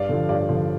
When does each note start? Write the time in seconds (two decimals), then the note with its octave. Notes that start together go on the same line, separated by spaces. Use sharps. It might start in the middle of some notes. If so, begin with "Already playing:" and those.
Already playing: G2 D5 F5
0.09 D3 F3
0.29 G2 D5 F5
0.49 D3 F3